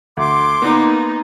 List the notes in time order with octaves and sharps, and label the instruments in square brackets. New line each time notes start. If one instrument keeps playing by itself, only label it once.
[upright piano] D2 [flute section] C6 D6
[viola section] A#3 D#4 [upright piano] B3